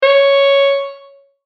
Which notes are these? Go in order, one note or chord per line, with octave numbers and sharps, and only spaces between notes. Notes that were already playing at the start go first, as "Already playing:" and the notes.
C#5